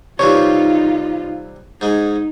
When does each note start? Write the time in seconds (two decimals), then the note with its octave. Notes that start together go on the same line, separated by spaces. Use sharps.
0.19 C3 E3 G3 D#4 F4 C#5
1.81 G#2 G#3 D#4